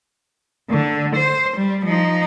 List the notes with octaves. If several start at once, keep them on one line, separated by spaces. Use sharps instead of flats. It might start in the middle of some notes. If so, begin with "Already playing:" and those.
D3
C5
G3
F3 D#4